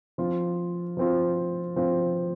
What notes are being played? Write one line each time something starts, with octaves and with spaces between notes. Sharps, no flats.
F3 C4 F4
F3 C4 F4
F3 C4 F4